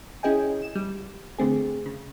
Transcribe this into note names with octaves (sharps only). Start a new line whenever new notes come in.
C#4 E4 G#4 D#5 G5 G#5
E7
G3
D3 A3 C4 G#4
C#3